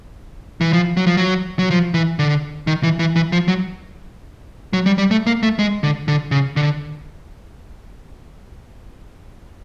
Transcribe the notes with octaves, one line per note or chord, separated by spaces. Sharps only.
E3
F3
F#3
F3
F#3
F#3
F3
E3
D3
D#3
E3
E3
E3
F3
F#3
F#3
G3
G3
A3
A#3
A3
G#3
D3
D3
C#3
D3